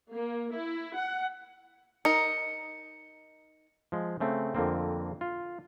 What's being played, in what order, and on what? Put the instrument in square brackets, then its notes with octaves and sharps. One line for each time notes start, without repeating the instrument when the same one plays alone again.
[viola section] A#3
E4
F#5
[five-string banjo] D#4 A#4 [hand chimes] C#7
[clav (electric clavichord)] F3 G#3
C#3 A3 C4
F2 D3 A#3 C4
F4